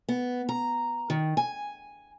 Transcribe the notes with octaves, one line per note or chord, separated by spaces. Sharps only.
B3
A#5
D#3
G#5